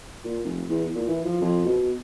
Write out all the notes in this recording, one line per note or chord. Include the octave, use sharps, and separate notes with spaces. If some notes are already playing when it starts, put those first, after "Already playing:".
A#2
F1
E2
A#2
E3
F3
F2
B2